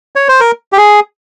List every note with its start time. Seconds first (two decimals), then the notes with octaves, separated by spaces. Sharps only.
0.16 C#5
0.28 C5
0.40 A#4
0.72 G4
0.78 G#4